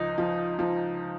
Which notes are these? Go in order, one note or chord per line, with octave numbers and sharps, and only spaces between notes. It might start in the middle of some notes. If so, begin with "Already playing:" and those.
Already playing: C#2 F3 D#4
F3
F3